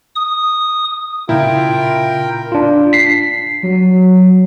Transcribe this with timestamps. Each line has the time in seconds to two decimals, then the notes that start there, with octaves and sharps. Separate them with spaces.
0.16 D#6
1.29 A#2 C#3 E4 F4 A#4 G5
2.52 D4 F4
2.93 B6 C7
3.63 F#3